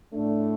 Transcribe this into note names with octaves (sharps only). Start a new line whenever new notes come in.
A2 A3 D4